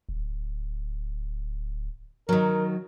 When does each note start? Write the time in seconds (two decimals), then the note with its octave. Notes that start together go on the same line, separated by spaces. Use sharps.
0.09 D1
2.29 D#3 F#3 A#4